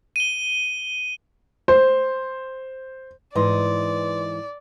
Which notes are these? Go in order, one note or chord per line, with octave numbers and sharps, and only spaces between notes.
D#7 G7
C5
G#2 E3 B4 D5 D#5 C6